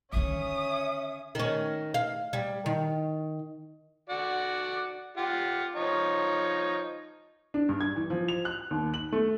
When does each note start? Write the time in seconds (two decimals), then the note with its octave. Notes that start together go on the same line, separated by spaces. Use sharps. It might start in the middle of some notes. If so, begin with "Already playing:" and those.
0.13 D3 D#3 C#4 E5 D#6
1.35 D#3 C#4
1.94 F5
2.33 G3
2.66 D#3
4.10 F#4 D5 F#5
5.17 F4 G4 F#5
5.75 F3 D#4 C#5
7.54 D4
7.69 G2
7.81 G#6
7.96 E3
8.10 F3
8.28 F7
8.45 F#6
8.71 D#2
8.94 F#7
9.12 A3